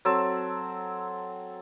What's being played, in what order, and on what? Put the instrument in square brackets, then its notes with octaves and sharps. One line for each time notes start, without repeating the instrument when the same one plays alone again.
[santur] F#3 C4 A4 E6